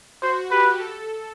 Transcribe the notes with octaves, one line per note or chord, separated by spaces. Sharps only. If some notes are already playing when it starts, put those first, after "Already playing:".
F#4 C5
G4 B4
A4